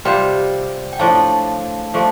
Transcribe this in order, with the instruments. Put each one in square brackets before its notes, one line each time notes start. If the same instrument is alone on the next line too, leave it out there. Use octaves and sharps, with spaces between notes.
[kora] C3 G3 F4 C5 [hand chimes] D5 G5
[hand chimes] G5
[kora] A2 F3 D4 [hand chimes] F5 A5
[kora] F3 A3 D4